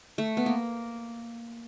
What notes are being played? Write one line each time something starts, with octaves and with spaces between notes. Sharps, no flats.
A3
B3
A#3